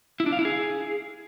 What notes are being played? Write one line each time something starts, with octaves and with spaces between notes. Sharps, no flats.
E4
D4
F5
E4
G#4